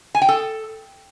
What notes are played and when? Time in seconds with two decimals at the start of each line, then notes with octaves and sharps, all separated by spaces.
0.15 G#5
0.22 G5
0.29 A4